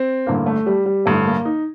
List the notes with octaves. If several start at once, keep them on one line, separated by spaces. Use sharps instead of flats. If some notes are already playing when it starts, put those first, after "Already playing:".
Already playing: C4
A1 G2 D3 A#3
A3
G3
G3
A1 G2 D3 A3
A#3
D#4